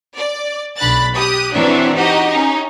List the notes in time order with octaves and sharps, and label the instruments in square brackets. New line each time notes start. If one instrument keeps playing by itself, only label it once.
[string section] D5
B1 D4 B5 F#6 A6
G4 D#6 F#6
E3 F#3 C4 D4 E5
D#4 F#4 G4 D#5
C#4 D#4